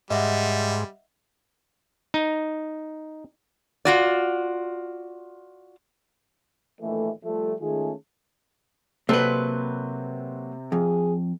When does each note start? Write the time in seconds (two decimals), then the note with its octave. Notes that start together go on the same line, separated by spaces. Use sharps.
0.10 G#2 G3 D#5 E5 F#5
2.14 D#4
3.85 F4 F#4 D5
6.82 A#1 D#2 E3 A3
7.24 F3 G3 A3
7.61 D#3 G#3 A3 C#4 F4 G#4
9.09 C3 F#3 A#3 C4 A4 B4 C5
10.72 F2 G#4